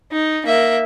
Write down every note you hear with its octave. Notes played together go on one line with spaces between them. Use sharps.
D#4
A#3 E5